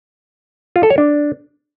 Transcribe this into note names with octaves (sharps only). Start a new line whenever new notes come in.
F4
A4
C#5
D4